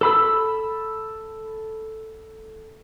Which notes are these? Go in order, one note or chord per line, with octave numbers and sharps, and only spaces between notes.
A4 B5 E6